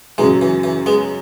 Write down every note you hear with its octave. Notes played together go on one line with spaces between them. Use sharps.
F#2 C#3 E3 F#3 G#3
E3
E3
G#3 B3